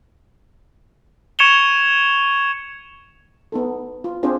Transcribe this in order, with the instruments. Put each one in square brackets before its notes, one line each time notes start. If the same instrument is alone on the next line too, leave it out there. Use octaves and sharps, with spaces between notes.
[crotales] C#6 G#6 C#7 E7 F7 G7
[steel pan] B3 D#4 A4
F4
C4 D4 F4 G#4 C5